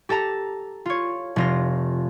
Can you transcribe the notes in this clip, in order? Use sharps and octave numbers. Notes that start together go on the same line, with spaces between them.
G4 A4 A5 A#5
F4 C#5
F1 F4 A#6